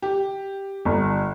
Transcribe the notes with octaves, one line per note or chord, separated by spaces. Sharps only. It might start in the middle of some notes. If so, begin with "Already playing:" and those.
G4
G1